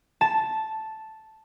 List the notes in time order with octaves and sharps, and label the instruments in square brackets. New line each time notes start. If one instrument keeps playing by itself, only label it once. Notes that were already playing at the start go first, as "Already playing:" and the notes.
[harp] A5